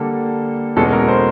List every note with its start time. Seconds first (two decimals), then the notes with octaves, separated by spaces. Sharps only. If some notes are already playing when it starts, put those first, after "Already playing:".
Already playing: D3 G3 A#3 A4
0.76 E2 B2 G#3 C#4 A4
0.93 A#4
1.08 C5